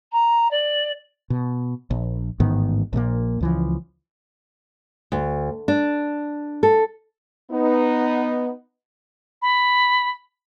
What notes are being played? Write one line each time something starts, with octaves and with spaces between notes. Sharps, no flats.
A#5
D5
B2
A#1
A1 G#2 D#3 B3
A#1 A#2 F3 A#3
C#2 E3 F3
D2
D4
A4
B3 D#4 B4
B5